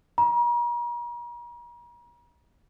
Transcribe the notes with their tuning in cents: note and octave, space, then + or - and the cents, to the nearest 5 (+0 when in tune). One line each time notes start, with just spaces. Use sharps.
A#5 +40